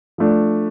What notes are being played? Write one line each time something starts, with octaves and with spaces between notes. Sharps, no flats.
F3 A3 D4